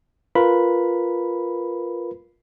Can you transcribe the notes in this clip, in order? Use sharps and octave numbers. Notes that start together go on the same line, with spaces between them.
F4 A#4 B4 B5